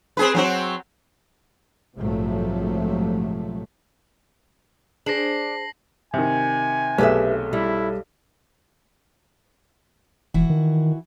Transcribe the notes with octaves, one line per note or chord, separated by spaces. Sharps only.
C4 G#4 B4
F#3 C4 F#4
A#1 G#2 C3 F3 F#3 A3
D4 G#4 C5 A#6 C7 F#7
C3 D#3 G#5
B1 A3 G4 G#4 B4 E5
G3 E4
E1 E3 E4 F#4
D#3